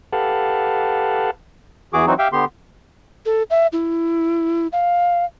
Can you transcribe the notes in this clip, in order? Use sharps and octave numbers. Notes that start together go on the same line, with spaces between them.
G4 A4 B4 F5 F#5 A5
E2 E3 F#4 G#4 D6
E3 F#3 C4 D#4 F#4
G4 E5 F5 G5
D3 B3 G4 C6
A4
E5
E4
F5